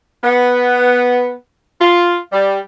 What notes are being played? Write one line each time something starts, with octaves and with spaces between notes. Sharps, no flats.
B3
F4
G3